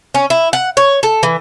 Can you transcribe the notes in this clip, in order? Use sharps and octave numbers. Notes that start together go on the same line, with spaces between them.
C#4
E4
F#5
C#5
A4
E3